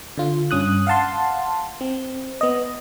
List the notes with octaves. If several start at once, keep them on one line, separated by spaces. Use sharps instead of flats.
D3 F4
G2 C#4 D#6 F#6
F5 F#5 A5 C6
C4
B3 D#5